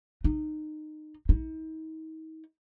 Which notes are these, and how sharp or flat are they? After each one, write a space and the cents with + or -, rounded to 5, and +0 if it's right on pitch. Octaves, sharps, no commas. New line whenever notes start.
D#4 -20
D#4 +40